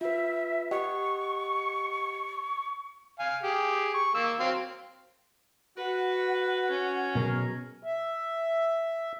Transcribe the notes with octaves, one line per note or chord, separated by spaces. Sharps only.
F4 B4 E5
G4 D#5 F#5 C#6
F5 G#5
G4 G#4
C#6
A#3 E6
F#3 C4 F5
F#4 B4 F#5
C#4
B2 F#3 G#4 A#4
E5